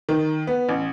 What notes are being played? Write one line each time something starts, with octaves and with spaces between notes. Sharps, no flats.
D#3
B3
A1